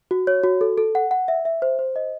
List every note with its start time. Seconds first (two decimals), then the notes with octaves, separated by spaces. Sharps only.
0.11 F#4
0.27 C#5
0.43 F#4
0.61 A4
0.78 A4
0.95 F#5
1.11 F#5
1.28 E5
1.45 E5
1.62 C5
1.79 C5
1.96 D#5